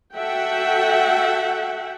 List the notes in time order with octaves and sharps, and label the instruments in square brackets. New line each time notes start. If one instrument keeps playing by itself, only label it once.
[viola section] F#4 A4 E5 F#5 G5